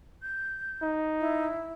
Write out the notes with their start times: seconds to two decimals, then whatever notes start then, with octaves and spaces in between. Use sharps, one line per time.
0.23 G6
0.82 D#4
1.20 E4